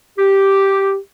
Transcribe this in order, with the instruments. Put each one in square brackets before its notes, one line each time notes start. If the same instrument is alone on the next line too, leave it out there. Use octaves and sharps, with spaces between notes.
[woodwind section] G4